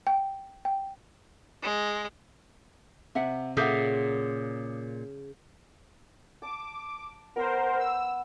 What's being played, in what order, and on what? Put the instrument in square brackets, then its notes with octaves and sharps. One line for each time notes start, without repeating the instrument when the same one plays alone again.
[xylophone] G5
G5
[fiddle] G#3
[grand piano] C3 [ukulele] E5 F#5
[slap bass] A#2 [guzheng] C#3 [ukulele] A4 E5 F#5 [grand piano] D6 D#6 G6
[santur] A5 [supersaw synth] D6
[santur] B3 B5 D6 [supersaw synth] A#4 C5
[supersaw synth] E6